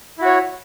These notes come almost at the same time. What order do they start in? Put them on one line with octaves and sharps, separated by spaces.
E4 F#4 C#5